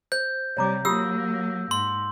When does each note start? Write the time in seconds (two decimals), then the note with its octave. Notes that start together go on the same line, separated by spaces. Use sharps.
0.12 C5 G6
0.57 C3 G3 C#5 A#5 D6
0.85 F#3 A#3 F4 G4 D#6 E6
1.71 G#2 C6